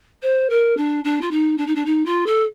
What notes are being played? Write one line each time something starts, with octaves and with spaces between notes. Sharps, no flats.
C5
A#4
D4
D4
F4
D#4
D4
D#4
D4
D#4
F4
A4